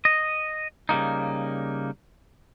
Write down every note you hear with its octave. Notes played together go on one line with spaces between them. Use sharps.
D#5
C#3 G3 A#3 D#4